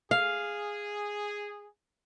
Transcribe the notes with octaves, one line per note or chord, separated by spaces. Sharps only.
G#4 F5